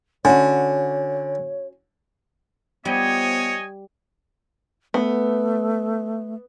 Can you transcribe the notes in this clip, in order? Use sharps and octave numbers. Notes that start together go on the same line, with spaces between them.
D3 C#4 F#4 C#5 G#5
F3 G3 B3 C#5 D#5 G#5
A3 B3